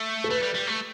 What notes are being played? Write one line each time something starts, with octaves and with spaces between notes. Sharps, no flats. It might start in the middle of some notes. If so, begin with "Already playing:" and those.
Already playing: A3
A4
A3 B4
G3
G3
A3